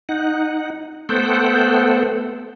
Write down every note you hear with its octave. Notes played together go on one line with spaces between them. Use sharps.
D#4 F#5
A3 B3 A4 C5 F#5 G5